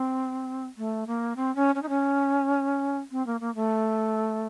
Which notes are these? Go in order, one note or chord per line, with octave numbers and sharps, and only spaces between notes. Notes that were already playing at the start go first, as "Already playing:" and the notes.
Already playing: C4
A3
A#3
C4
C#4
C#4
D#4
C#4
C4
A#3
A#3
A3